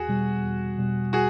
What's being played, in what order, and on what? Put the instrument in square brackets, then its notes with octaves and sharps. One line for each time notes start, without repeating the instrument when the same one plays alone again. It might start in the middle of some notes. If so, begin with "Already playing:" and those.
Already playing: [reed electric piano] E2 [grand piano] F#4 G#4
[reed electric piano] B2 G3
E2
B2 G3
[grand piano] F#4 G#4